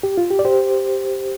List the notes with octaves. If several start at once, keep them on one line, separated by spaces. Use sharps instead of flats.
G4
F4
G4
D5
G4 C5